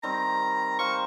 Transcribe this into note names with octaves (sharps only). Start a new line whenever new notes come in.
D#3 G3 C4 A#5
A#4 C5 F5 C#6